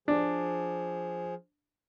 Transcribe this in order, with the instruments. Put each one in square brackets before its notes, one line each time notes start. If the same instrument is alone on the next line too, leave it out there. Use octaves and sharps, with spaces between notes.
[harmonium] F3 G#4 [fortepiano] D4